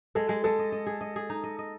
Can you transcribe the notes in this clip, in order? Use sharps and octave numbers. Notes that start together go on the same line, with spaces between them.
G#3 A4
G#3
G#3 A4
D#5
D#5
G#4
D#5
G#4
D#4
D#5
D#5